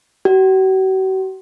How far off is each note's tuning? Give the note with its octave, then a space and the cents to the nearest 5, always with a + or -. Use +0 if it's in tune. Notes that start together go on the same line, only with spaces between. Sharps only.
F#4 +45